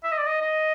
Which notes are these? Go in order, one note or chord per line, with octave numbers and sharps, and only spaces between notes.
E5
D#5
D5
D#5
D#5